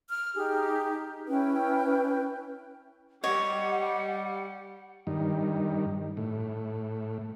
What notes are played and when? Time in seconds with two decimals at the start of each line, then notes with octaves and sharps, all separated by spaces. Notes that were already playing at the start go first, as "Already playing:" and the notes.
0.09 F6
0.36 D#4 G4 G#4
1.28 C#4 E4 B4 G5
3.24 G3 C#5 D#5 F#5
5.07 G2 D#3
6.17 A2